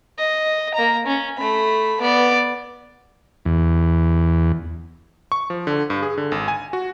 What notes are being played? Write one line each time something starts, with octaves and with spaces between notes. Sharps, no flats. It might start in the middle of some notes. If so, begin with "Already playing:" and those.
D#5
A#3 A#5
C#4
A3 B5
B3 D5
E2
C#6
F3
D3
G2
G#4
D3
G#1
G#5
F#4